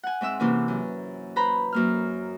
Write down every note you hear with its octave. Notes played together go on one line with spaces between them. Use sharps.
F#5 G#5
G#2 C4 E5 E6
C3 E3 A#3 C#4
F#2
B4 C5 A#5 B5
F#2 A#3 F6